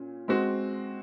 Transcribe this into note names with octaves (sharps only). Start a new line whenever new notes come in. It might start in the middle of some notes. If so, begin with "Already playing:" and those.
Already playing: A#2 C#4
G#3 C4 F#4